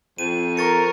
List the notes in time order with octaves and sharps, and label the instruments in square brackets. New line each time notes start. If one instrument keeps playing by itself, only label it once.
[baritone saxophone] F2 [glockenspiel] D#7
[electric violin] A#4 [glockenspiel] C#6 A6 C#7